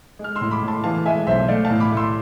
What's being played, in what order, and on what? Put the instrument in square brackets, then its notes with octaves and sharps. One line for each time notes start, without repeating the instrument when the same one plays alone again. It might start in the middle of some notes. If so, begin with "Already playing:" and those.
[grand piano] G#3
F6
C6 E6
A2
B5 D6
A2
A5 C6
E3 F5 A5
G#3 E5 G#5
B1 C5 E5
A3 D5 F5
F5 A5
A2
B5 D6
A3
C6 E6